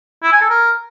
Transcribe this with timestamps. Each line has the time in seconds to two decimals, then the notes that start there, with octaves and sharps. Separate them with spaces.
0.23 E4
0.32 G#5
0.41 A4
0.50 A#4